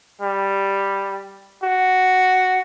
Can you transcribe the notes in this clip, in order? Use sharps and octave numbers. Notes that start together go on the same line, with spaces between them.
G3
F#4